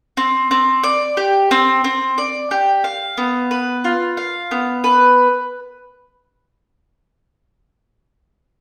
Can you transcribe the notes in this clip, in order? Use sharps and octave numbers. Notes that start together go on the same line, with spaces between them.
C4
C4
D5
G4
C4
C4
D5
G4
F5
B3
B4
F4
F5
B3
B4